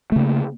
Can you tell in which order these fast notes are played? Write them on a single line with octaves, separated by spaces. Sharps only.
A3 C#3 A#3